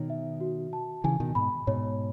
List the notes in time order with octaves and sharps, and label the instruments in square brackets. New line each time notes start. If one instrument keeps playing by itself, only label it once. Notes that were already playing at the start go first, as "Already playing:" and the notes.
Already playing: [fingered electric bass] B2 D#3 [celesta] C#5
[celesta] E5
F#4
A5
[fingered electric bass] C#3 E3 [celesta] G#5
[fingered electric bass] B2 D#3
[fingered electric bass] G#2 B2 [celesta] B5
[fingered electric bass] G#2 B2 [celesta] C#5